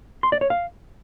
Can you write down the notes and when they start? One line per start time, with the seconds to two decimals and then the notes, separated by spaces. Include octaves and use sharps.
0.23 C6
0.32 D5
0.41 C#5
0.50 F5